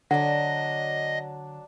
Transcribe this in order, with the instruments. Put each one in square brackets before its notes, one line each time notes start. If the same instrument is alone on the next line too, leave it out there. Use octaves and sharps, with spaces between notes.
[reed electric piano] D3 [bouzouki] F#3 D4 [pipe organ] D#5 [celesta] F#5